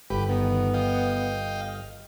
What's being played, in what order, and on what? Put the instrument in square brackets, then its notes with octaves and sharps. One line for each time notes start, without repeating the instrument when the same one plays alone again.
[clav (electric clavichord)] G1 [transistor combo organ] G4 B4
[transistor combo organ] D#3 [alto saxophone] B3
[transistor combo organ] D#5 F5 G5